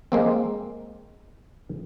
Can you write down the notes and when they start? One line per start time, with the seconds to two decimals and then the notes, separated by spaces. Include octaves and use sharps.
0.12 G#3 A#3 C4